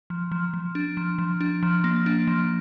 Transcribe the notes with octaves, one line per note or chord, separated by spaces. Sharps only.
F3
F3
F3
D4
F3
F3
D4
F3
A#3
D4
F3